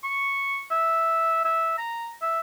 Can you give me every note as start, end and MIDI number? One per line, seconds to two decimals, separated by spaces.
0.04 0.64 85
0.71 1.41 76
1.45 1.74 76
1.78 2.10 82
2.21 2.40 76